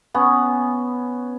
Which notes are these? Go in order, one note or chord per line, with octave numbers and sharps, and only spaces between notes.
B3 C#4